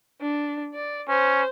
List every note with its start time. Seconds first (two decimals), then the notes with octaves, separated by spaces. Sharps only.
0.21 D4
0.74 D5
1.08 C#4 C5